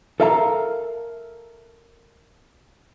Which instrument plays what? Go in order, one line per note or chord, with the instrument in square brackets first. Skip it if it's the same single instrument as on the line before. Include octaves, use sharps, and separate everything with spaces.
[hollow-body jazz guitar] A4 A#4 E5 F5 G5 A#5